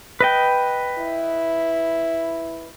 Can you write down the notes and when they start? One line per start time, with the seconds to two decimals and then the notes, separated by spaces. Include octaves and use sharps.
0.21 B4 D#5 G5
0.98 E4